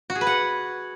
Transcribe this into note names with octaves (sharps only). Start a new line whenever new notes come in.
F#4
G#4
B4
F#5